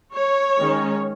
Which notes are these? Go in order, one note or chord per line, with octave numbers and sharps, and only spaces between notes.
C#5
D#3 G#3 C#4